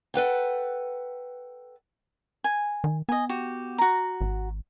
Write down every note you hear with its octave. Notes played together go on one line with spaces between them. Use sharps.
A4 B4 F#5 G5
G#5
D#3
B3 D#5 G#5
F#4 G4
F#4 A#5
G#1